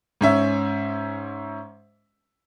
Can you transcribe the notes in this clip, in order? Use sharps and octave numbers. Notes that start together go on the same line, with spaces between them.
G#2 C#4 E5